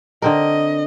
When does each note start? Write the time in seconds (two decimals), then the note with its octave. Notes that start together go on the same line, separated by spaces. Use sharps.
0.22 D3 C4 A#4 D#5